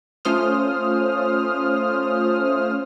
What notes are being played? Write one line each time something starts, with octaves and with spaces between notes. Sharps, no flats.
A3 C#4 F4 C5 D#6 F6